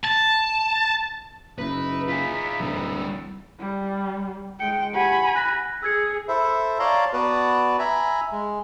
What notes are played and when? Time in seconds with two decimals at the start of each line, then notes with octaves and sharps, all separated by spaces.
0.05 A5
1.58 F#1 D#4 E4 B4
2.08 F4 G#4 B6
2.60 D1 E3 G3 E6
3.60 G3
4.60 G#3 G5 C#7
4.95 G4 F#5 G#5 B5 C#7
5.35 F#6 A#6 B6
5.83 G#4 E6 G#6 C#7
6.28 E4 A4 C5 E5
6.79 C#5 D5 F5 A5 A#5 C6
7.13 B3 F#4 B4 D5 A5
7.79 E5 G#5 A#5 B5
8.32 G#3